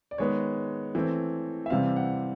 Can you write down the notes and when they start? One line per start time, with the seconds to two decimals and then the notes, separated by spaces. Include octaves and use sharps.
0.11 D5
0.18 D#3 G#3 B3 C#5
0.95 E3 A3 C4
1.66 E5
1.70 C3 E3 G3 C4 F5
1.96 F#5